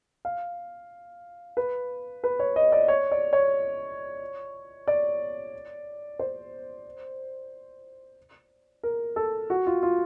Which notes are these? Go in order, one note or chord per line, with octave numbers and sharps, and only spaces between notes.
F5
B4
B4
C#5
D#5
D5
C#5
D5
C#5
D5
C5
A#4
A4
F#4
F4
F4